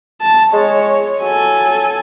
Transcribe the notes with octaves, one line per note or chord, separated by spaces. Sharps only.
A5
G#3 C#5
F#3 A4 G#5